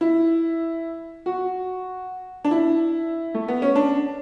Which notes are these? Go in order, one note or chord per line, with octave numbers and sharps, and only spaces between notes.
E4
F#4
D4
E4
A3
B3
C#4
D4